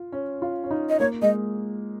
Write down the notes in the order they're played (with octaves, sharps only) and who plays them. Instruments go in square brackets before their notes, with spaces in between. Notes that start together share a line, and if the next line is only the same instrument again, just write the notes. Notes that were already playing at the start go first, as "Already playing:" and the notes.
Already playing: [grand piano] F4
C#4
F4
C#4
D#4
[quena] D#5
[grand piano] A#3 [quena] C#5
[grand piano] G#3 [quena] D#5